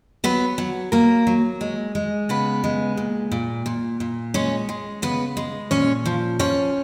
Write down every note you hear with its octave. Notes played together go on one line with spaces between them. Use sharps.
F#3 B3 B4
F#3
F#3 A#3 A#4
F#3
G#3
G#3
C#3 B3 B4
G#3
A#2
A#2
A#2
A#2
G#3 C#4 C#5
G#3
C#3 B3 B4
G#3
A#2 C#4 C#5
F3
F3 C#4 C#5